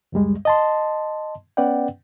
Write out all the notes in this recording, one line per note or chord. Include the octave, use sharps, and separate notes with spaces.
C#2 F#2 G3 G#3
D#5 A5 C6
B3 C#4 B4 D5 F#5 G5